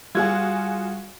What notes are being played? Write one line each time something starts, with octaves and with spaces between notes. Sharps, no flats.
G3 F4 F#4 G#4 G#6